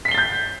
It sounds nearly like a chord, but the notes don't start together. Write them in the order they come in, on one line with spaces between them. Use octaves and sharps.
B6 C7 G7 A6 G6